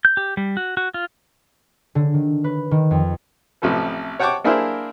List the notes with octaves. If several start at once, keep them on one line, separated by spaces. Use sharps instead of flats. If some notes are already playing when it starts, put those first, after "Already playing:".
G6
G4
G3
F#4
F#4
F4
D3
D#3
B4
D#3
F2
A1 C3 F3 A4 B4
C#5 F#5 G5 A5 C#6 D6
A#3 D4 E4 G#4 A#4 C5